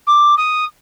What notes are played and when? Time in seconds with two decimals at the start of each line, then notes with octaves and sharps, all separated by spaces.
0.07 D6
0.37 D#6